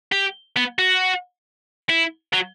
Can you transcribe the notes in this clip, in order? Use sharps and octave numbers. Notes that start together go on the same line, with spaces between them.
G4
B3
F#4
E4
F#3